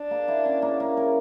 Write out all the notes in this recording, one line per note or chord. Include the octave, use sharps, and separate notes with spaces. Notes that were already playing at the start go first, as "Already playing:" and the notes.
Already playing: D4
A#3
E4
C#4
A#3
A#3
A#4